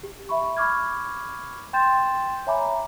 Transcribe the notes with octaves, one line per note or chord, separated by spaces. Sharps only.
G4
E5 B5 C#6
B5 C#6 D6 F6 G#6
G5 C6 G6 A6 E7
C#5 E5 G#5 A#5 B5 D6